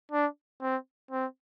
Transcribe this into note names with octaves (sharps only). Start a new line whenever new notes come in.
D4
C4
C4